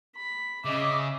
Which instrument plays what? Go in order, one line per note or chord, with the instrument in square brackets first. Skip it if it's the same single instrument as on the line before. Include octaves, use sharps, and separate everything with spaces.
[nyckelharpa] B5
[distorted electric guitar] C#3 [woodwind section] D#5 D6 [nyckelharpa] E5